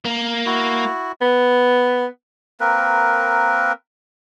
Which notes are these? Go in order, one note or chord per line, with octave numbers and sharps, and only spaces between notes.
A#3
E4 F#4
B3
A#3 C4 A#4 B4